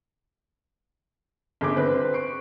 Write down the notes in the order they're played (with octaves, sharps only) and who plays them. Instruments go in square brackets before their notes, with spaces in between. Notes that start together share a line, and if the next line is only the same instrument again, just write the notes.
[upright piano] G1 G#4 D6
C4 B4
C#6 C7 D7